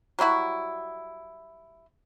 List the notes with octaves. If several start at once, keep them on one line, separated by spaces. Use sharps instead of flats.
F#3 G3 E4 F#4